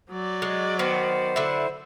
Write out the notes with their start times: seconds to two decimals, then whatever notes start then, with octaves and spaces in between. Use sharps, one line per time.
0.11 F#3 D5
0.42 G#3
0.79 D#3 B3 C5
1.36 D3 E4